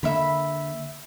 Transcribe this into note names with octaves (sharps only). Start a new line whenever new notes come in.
D3 A#3 E5 B5